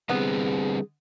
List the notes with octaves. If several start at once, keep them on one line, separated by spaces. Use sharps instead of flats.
D3 G3 B3 C4 G#4